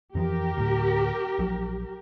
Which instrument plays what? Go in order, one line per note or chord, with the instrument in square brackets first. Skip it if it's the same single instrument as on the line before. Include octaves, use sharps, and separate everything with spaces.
[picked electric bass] F2 E3 F3 [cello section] G4 A#4
[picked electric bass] D2 A2
A#1 F3 F#3